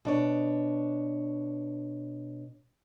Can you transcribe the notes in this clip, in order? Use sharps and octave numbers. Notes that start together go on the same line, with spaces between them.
B2 D4 C#5